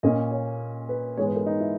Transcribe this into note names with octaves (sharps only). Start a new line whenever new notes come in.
A#2 A#3 C#4 D#5
C#5
B4
G#2 E3 G#3 B3 C#5
B4
A#4
D#4
E4